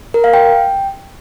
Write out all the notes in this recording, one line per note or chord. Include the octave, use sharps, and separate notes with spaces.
A#4
F5
G5